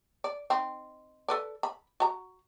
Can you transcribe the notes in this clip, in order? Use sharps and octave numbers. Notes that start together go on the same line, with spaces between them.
D5
C4 D#4
A4 B4 D5
B5
F#4 A#5